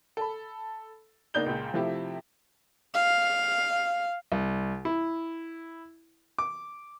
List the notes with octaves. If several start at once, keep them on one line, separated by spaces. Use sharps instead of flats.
A4 B5
C#2 A#3 D4 D#4 G6 G7
C#2 A#2
C3 F3 A3 E4 G4
F5
C2
E4
D6